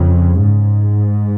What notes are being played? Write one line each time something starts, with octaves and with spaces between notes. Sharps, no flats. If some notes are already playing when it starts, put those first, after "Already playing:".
Already playing: F2 C#3
G#2